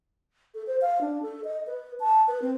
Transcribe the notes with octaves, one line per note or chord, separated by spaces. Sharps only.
A4
C5
F5
D4
A4
D#5
B4
A5
B4
C4